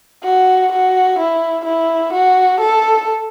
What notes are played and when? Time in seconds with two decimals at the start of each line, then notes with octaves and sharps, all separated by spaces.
0.24 F#4
0.72 F#4
1.19 E4
1.65 E4
2.13 F#4
2.60 A4